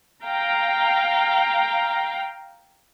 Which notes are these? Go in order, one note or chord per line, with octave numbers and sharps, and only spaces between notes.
F5 G5 A#5